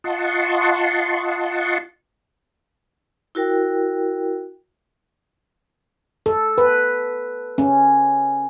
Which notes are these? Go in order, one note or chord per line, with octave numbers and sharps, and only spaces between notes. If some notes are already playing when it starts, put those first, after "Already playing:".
F4 D#5 F#5 A5 C6 C#6
E4 F#4 A#4 G5
A4
B4
C#4